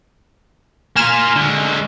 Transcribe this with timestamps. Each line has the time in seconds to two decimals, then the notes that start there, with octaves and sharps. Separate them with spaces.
0.96 A#3 F4 G#5 F6 E7
1.36 D3 G#3